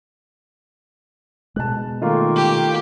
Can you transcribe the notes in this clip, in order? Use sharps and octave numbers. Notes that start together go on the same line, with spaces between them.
B2 G#3 A5 F#6
D#3 A3 A#3 F4
G4